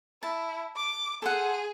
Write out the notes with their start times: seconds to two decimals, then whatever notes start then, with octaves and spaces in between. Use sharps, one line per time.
0.23 E4 A5
0.76 D6
1.22 G#4 A4 C5 F#5